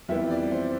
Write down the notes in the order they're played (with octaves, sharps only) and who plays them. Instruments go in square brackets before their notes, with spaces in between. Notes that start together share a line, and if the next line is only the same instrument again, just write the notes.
[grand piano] F2 E3 G3 B3 E5
D5
C5